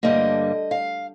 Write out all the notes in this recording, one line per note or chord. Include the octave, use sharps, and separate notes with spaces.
G2 D3 G3 A#3 D#5
F5